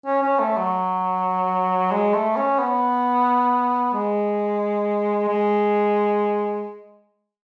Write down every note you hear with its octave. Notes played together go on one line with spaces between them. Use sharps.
C#4
C#4
A3
F#3
G#3
A3
C#4
B3
G#3
G#3